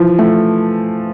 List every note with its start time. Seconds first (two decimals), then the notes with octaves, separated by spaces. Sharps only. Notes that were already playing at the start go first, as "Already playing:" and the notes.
Already playing: E3 F3
0.18 A3